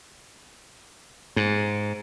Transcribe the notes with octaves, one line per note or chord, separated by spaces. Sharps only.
G#2